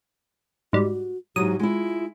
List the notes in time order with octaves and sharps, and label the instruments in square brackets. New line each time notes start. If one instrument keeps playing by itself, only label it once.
[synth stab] G#2 G3 [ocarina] F#4
[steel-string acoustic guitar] G#2 E3 F#3 [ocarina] G4 [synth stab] D#6
[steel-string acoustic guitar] G#3 E4 [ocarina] F4